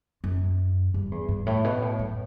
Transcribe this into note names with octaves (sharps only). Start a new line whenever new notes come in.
F#2
G2
E2
G2
A2
B2
A2
F#2